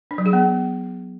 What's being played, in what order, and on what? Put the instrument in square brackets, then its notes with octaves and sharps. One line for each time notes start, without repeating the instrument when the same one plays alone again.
[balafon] D4
F#3
G#4
B3